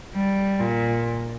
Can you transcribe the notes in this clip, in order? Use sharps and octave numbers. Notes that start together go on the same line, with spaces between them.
G3
A#2